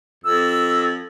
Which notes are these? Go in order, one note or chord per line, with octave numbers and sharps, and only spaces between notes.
F2 E6